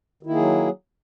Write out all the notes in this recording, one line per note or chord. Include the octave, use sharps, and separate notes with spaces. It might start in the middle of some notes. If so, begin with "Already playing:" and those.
D#3 F#3 A#3 E4 G#4